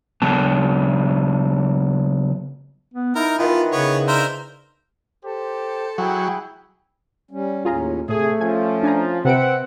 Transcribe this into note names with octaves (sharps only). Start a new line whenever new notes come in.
C#3 F#3 B3 A5
B3
D#4 E4 A#4
D#3 E3 B3 F4
C#3 B3 C#5
D4 A#4 C5 E5 F5
G4 A4 C5
F#3 E4 G#4 G5
G3 C#4
D#2 A2 C#4 F4 G#4 A#5
A2 C3 A3 G#4
F3 C#4 F4 G#5
D4 G#5 A#5
C3 C4 B4 E5 F#5 D7